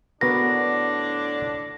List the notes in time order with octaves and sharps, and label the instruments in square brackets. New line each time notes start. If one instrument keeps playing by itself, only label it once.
[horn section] A2 D3 D4 [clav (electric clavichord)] B3 F#4 A#4 [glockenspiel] A#6